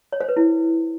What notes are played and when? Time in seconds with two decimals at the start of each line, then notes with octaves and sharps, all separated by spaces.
0.12 C#5
0.21 C5
0.29 B4
0.37 E4